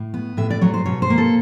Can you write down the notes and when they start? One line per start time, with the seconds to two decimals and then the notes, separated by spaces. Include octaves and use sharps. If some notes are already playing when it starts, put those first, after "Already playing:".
Already playing: A2
0.14 B3
0.37 A2 E5
0.50 D5
0.61 F#3 C#5
0.74 C5
0.86 B2 C#5
1.02 C5
1.10 A#3
1.18 A4